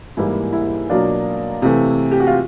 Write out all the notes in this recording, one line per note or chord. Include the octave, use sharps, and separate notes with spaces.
G#2 E3 G3 A#3 E4
E4
B2 F#3 A#3 D4 F4
C3 E3 A3
G4
F#4
F4